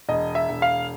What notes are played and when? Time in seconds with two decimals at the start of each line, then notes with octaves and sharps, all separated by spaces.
0.09 E1 D#5
0.35 E5
0.49 E1
0.62 F5